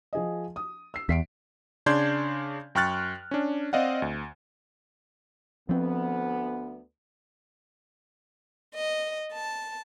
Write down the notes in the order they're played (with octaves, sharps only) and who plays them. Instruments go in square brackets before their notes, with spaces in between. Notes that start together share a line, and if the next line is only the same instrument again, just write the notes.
[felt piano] F3 G#4 D#5
D#6
E6 C7
[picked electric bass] E2 [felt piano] B6 C7 D7
[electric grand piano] C#3 D4 D5 C6 G6 G#6
F#2 G5 C#6 F6 F#6 A6
C#4 D4
C4 D5 D#5 F5 F#5
D2
[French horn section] D2 B3 [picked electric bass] F3 C4
[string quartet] D#5
A5